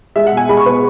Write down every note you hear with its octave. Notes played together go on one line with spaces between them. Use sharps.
G#3 E5
F#5
B2 G#5
G#3 B5
C#6
B2 B4